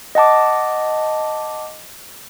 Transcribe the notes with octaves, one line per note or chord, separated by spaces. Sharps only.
D#5 F#5 A5 D6